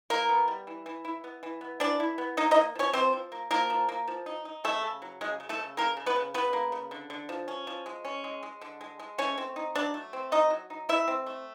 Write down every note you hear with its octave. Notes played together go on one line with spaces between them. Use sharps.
E3 A#3 A#4
B3
G3
E3
E3
E4
B3
E3
B3
E3 D4 D5
E4
B3
A#3 D#4 D#5
D#4 D#5
A#3
F3 C#4 C#5
F3 C4 C5
F3
A#3
F3 A#3 A#4
F3
A#3
F3
D#4
D#4
C#3 A3 A4
C#3
F#3
C#3 G#3 G#4
C#3
A3 A4
C#3
C#3 A#3 A#4
C#3
B3 B4
C#3
C#3 B3 B4
A#3
C#3
D3
D3
F3
C#4
F3
G#3
C#4
G#3
G#3
D3
G#3
G#3
A3 C#4 C#5
C4
D#4
F#3 D4 D5
A3
C4
A3 D#4 D#5
F#3
D#4
A3 E4 E5
C4
A3